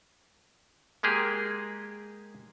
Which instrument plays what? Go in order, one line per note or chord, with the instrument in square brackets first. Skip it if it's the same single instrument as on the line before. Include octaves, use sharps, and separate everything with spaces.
[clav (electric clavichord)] G#3 A#3 G4 G#4